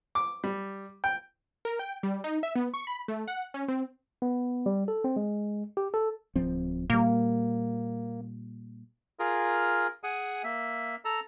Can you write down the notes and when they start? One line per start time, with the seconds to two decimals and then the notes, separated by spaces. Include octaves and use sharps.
0.15 D6
0.44 G3
1.04 G5
1.65 A#4
1.79 G5
2.03 G3
2.24 D#4
2.43 E5
2.56 B3
2.74 C#6
2.87 B5
3.08 A3
3.28 F#5
3.54 C#4
3.68 C4
4.22 B3
4.66 G3
4.88 A4
5.04 C4
5.16 G#3
5.77 G4
5.94 A4
6.36 D1 F3 C4
6.90 A#2 G3 A#3
9.20 F4 G#4 A#4
10.04 G#4 F#5 G#5 D#6
10.44 A#3 E5
11.05 A4 A#5 E6